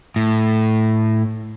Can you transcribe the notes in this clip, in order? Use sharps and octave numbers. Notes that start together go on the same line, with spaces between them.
A2